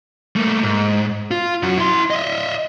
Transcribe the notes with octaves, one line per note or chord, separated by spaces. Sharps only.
A3 A#3
G#2
F4
F#2 F#4
E4 C6
D#5 E5